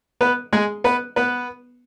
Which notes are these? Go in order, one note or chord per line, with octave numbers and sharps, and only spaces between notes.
B3 B4
G#3 G#4
B3 B4
B3 B4